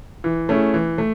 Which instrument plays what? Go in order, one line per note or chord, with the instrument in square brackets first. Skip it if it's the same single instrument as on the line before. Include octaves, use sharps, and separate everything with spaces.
[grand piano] E3
A3 C#4 E4 G#4
E3
A3